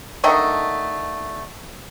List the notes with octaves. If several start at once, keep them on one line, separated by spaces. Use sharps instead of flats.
D3 D#3 A3 D#5